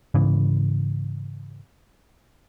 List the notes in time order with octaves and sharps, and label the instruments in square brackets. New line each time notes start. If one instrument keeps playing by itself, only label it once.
[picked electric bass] G#2 C#3 E3